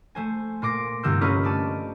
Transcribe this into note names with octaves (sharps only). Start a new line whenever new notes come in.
A3 C5 G#5
A#2 C6 D6 A#6
C2 G2 D3 E6 G6 C7
C#4 F4 A#4 B4 C#5 D#5
A3 D5 A5 D#7